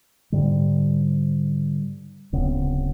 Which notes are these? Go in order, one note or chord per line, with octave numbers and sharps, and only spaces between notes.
G#2 D3 G3
D1 C#3 B3 C4